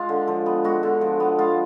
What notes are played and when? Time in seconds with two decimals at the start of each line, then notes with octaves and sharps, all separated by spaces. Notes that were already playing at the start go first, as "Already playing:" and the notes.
Already playing: G#3 F4
0.09 D3
0.28 F3
0.46 B3
0.64 G#3 F#4
0.83 D3
1.01 F3
1.20 B3
1.39 G#3 F4